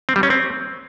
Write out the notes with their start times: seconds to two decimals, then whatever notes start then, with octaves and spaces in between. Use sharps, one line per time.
0.09 C4
0.16 G3
0.23 C#4
0.30 C4